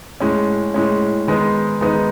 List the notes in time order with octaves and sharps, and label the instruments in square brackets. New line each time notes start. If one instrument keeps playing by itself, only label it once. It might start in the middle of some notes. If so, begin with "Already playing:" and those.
[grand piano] A2 G#3 C#4
A2 G#3 C#4
D#3 G#3 B3 D#4
D#3 G#3 B3 D#4